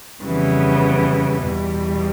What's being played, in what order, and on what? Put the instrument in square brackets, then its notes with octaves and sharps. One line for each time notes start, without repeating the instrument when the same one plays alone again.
[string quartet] F2 C#3 E3 G3 B3
E2 B2 G3